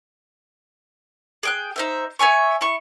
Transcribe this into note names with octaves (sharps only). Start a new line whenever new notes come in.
G#4 G5 F#6
D#4 C5 E5
C#5 E5 G#5 C#6
E4 C#6